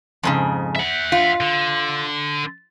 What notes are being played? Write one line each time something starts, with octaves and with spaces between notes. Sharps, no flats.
F2 G#2 C#3
E5 F#5
F4
D3